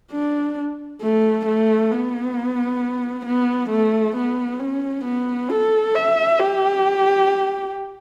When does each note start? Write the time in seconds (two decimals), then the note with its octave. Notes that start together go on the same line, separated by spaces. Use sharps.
0.12 D4
1.02 A3
1.46 A3
1.91 B3
3.26 B3
3.70 A3
4.16 B3
4.60 C#4
5.05 B3
5.50 A4
5.95 E5
6.39 G4